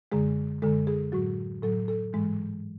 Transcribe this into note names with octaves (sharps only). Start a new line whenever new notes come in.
F#2 D3 G#3 G#4
F#2 D3 G#3 A4
G#4
A2 F#3 F#4
A2 F#3 A4
A4
G#2 E3 G#3